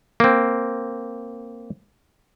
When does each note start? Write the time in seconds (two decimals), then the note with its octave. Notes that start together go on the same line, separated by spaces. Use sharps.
0.20 A#3 C4